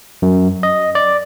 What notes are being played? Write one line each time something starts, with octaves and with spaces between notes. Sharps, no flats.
F#2
D#5
D5